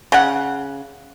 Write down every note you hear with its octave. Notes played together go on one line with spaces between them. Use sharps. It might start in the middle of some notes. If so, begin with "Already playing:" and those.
C#3 F#5